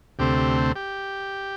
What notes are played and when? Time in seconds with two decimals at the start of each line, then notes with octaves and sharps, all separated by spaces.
0.19 D2 C3 A3 C4 G4
0.37 G4
0.76 G4